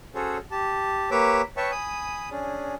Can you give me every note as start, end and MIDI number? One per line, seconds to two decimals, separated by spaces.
0.15 0.38 61
0.15 0.38 66
0.15 0.38 68
0.15 0.38 69
0.15 0.38 72
0.15 0.38 73
0.51 1.10 67
0.51 1.10 81
1.11 1.42 58
1.11 1.42 67
1.11 1.42 71
1.11 1.42 73
1.11 1.42 86
1.11 1.42 88
1.57 1.71 71
1.57 1.71 73
1.57 1.71 76
1.57 1.71 79
1.57 1.71 81
1.57 1.71 85
1.71 2.29 80
1.71 2.29 83
1.71 2.29 87
2.31 2.75 61
2.31 2.75 62
2.31 2.75 68